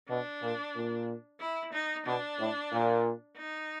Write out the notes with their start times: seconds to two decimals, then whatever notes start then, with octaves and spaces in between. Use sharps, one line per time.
0.09 B2 D4
0.42 A#2
0.75 A#2
1.40 E4
1.73 D#4
2.06 B2 D4
2.39 A2
2.72 A#2
3.37 D#4